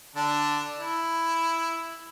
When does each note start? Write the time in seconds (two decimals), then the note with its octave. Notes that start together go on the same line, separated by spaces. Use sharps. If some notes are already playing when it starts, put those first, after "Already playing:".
0.15 D3 D4 A5
0.78 E4